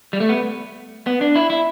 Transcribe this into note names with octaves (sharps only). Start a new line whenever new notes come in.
G3
A3
B3
B3
D4
E4
E4